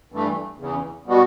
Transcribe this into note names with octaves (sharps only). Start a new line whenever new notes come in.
G2 E3 A3
E2 C#3 E3
B2 G3 B3 F#4